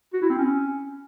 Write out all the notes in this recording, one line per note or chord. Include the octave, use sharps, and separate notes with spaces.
F#4
E4
C4
C#4